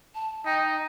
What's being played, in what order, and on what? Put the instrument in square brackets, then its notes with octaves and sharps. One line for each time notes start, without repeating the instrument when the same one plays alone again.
[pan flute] A5
[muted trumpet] D#4 [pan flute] G5